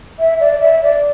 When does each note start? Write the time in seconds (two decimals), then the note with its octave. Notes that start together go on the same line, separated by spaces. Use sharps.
0.19 E5
0.40 D5
0.60 E5
0.83 D5